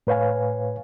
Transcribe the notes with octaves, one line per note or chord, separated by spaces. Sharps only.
A2 B4 C#5 F5 G#5